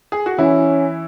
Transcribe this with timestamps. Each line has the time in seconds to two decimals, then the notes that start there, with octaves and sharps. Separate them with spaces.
0.12 G#4
0.26 F#4
0.38 E3 C#4 E4